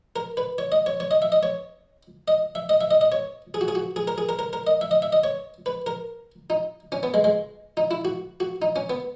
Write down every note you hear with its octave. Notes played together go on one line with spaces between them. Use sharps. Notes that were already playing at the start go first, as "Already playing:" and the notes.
A#4
B4
C#5
D#5
C#5
C#5
D#5
E5
D#5
C#5
D#5
E5
D#5
E5
D#5
D#5
C#5
G#4
F#4
G#4
F#4
G#4
A#4
G#4
A#4
A#4
A#4
D#5
E5
D#5
E5
D#5
C#5
B4
A#4
D#4
C#4
B3
G#3
G#3
D#4
E4
F#4
F#4
D#4
C#4
B3